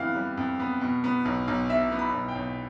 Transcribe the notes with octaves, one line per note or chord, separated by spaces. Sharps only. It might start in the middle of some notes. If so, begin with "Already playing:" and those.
Already playing: F2 E3 G3 B3 F5
G3
F2
B3
B2
B3
B1
B1
B2 E5
B3
B5
B1
G5
B1